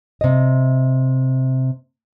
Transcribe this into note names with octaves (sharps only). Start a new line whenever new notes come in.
C3 D#5